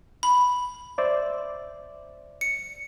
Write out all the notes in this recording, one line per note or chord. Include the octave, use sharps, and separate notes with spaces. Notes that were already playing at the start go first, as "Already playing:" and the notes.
B5
C5 D5 E5
C#7